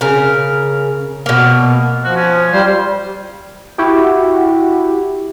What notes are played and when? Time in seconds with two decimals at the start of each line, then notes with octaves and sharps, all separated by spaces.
0.01 C#3 A#4
1.26 B2 A#3
2.04 F3 F#4
2.16 C#4
2.52 G3 F4 C5
3.78 E4 F#4 G4